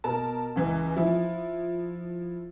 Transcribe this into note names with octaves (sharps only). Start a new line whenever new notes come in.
B2 A#4 A5
C#2 E3
F3 E4